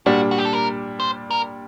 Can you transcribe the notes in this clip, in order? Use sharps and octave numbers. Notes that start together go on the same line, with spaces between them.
A#2 G3 D4 F#4
F#4
G4
A4
A#4
C5
A#4